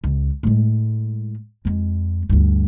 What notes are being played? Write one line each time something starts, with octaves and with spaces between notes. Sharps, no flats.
C#2
A2 G#3
F2 G#3
D2 G2